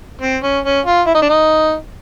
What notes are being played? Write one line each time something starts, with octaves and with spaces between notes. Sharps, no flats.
C4
C#4
C#4
F4
E4
D#4
D4
D#4